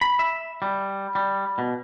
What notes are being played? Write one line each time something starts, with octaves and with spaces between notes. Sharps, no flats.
B5
E5
G3
G3
B2